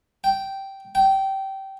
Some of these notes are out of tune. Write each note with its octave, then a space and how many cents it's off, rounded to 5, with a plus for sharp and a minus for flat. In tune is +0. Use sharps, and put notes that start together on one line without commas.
G5 -10
G5 -20